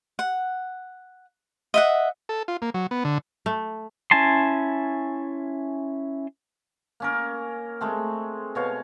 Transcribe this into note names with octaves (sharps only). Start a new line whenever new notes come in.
F#5
D#5 E5 F#5
A4
F4
A#3
F#3
B3
D3
A3
C#4 E4 G#5 A5 C6
A#3 C#4 A#4
G#3 A3 C4
B2 C#5 F5